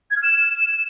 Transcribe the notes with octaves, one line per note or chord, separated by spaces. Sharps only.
G#6
F6
E7